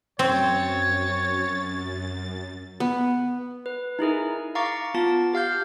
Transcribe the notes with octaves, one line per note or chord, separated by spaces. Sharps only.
F#2 C4 C#5 A6
B3
B4
D#4 E4 G#4 A#4
F5 A#5 C#6 D6 A6
B3 F4 A5 A6
G4 F5 F6 G6